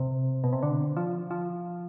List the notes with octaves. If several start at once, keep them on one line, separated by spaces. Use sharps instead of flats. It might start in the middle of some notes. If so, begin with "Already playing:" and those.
Already playing: C3
B2
C3
D3
F3
F3